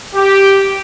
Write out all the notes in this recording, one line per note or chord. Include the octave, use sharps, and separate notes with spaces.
G4